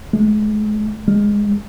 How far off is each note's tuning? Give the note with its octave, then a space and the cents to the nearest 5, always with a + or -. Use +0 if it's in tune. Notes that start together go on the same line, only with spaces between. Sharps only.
G#3 +40
G#3 -10